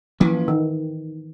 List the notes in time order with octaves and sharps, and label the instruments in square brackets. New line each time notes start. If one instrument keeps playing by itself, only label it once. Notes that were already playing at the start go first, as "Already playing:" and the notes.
[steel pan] E3 [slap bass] F3 A#3 C#4
[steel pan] D#3